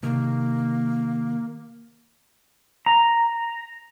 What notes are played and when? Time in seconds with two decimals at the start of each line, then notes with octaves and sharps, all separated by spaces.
0.03 C3 D#3 A#3
2.86 A#5